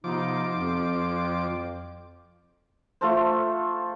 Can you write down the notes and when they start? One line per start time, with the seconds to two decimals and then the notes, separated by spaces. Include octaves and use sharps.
0.04 C3 F3 B3 D#4 D6
0.56 F2
3.01 A3 F4 A4 C5